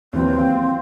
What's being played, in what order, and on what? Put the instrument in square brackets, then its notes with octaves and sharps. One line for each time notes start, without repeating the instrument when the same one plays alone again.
[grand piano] D#2 E3 F#3 [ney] C4
[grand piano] F5 G5